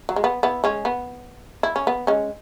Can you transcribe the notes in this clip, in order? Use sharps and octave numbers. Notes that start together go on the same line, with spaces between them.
F#3
G#3
B3
B3 E4
G#3 C#4
B3
E4
C#4
B3
G#3 C#4